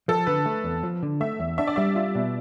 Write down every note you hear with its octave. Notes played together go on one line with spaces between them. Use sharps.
F3 A4
D3 B4
A3
E2
F3
D3
A3 E5
E2
D4 E5
D5
G3 E5
F4
B2